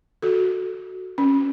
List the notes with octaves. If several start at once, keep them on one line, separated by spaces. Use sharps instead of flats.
F#4 A4
C#4